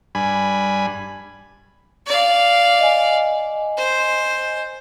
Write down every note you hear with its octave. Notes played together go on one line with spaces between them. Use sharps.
G2 G#5 B5
D5 F5
D#5 G#5
C5